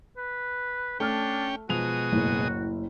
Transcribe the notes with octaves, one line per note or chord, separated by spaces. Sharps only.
B4
A3 C#4 D4 G5 F6
B2 F3 G#3 F#4 D#6 F7
F#1 A2